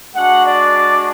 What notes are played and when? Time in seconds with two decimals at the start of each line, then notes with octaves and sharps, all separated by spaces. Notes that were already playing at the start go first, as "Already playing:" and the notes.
0.15 G#3 D4 F#4 F#5
0.46 D5